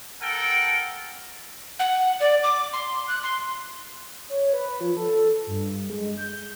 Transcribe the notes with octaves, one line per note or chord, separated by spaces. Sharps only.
A4 A#4 F#5 G5
F#5
D5
D6
C6
F#6
C6
C#5
B4
F3
A4
G2
G#3
G6